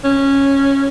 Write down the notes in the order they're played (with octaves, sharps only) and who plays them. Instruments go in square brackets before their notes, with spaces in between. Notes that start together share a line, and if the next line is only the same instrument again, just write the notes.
[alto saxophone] C#4